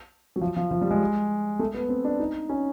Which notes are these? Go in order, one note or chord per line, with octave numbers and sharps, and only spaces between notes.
F#3
F3
F3
F3
G3
G#3
A3
B3
C4
D4
D#4
C#4